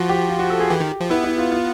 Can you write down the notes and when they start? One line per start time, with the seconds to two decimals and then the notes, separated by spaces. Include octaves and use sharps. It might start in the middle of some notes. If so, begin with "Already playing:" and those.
Already playing: F3 F#4
0.09 G4
0.29 F4
0.39 F#4
0.50 A4
0.60 G#4
0.69 E3 G4
0.80 D#3
1.00 F3
1.10 B3 E4
1.24 E4
1.38 F4
1.52 F4